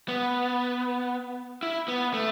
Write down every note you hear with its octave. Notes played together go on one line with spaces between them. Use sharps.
B3
E4
B3
A3